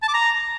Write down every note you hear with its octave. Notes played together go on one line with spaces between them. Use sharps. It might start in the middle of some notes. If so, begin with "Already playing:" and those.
A5
D6
A#5